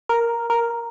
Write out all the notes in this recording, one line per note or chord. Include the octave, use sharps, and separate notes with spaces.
A#4
A#4